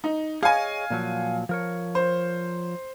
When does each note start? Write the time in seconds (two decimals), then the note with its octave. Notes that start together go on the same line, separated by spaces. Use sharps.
0.04 D#4
0.43 G#4 C#5 D#5 F5 G#5
0.90 A#2 F3 F#3
1.49 F3 A#4 C#5
1.95 C5